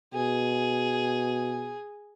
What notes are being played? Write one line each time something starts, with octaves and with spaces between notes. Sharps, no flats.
B2 G#4